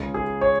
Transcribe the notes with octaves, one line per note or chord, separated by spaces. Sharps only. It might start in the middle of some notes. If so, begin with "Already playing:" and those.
Already playing: C#2 C#3 G#3
G#4
C#5